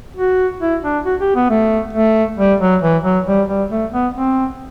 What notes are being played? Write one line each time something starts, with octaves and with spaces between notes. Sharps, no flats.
F#4
E4
D4
F#4
G4
B3
A3
A3
G3
F#3
E3
F#3
G3
G3
A3
B3
C4